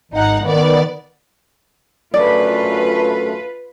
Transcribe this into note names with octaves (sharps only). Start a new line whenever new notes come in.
G#1 D#4 F#5
D#3 B3 D5
F#2 D3 A3 F4 B4 D5